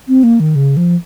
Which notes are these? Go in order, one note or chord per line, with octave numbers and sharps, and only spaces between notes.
C4
A#3
D#3
C#3
F3